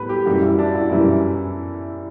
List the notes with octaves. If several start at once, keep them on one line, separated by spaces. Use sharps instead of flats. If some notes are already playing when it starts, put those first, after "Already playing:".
Already playing: A2 G3 B3 B4
G4
F#2 E3 G3 F#4
E4
D4
E4
F#4
F#2 E3 G3 E4